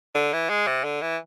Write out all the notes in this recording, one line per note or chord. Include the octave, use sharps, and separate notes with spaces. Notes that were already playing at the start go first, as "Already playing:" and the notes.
D3
E3
G#3
C3
D3
E3